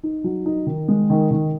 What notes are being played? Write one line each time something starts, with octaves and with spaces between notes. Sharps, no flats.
D#4
F#3
D#4
D#3
G#3
D#3
D#3